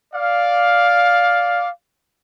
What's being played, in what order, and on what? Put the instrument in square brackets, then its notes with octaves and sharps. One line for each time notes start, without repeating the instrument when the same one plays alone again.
[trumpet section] D5 F5